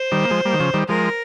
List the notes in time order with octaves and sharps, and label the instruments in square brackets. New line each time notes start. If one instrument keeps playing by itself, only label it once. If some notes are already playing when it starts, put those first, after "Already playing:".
Already playing: [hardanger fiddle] C5
[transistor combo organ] D#3 G3
A#3
F3 G#3
G3 A#3
D#3
C#3 F3
D#3 G3
[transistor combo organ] F3 G#3 [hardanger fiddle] A#4